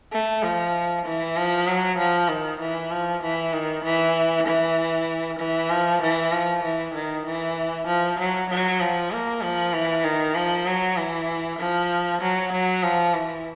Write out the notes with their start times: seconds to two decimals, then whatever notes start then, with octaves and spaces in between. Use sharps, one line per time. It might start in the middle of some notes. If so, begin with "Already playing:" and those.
0.13 A3
0.43 F3
1.05 E3
1.37 F3
1.67 F#3
1.98 F3
2.29 D#3
2.60 E3
2.91 F3
3.22 E3
3.53 D#3
3.84 E3
4.47 E3
5.39 E3
5.70 F3
6.02 E3
6.32 F3
6.63 E3
6.94 D#3
7.26 E3
7.87 F3
8.19 F#3
8.50 F#3
8.80 F3
9.11 A#3
9.42 F3
9.73 E3
10.04 D#3
10.35 F3
10.66 F#3
10.97 E3
11.59 F3
12.21 F#3
12.52 F#3
12.83 F3
13.14 E3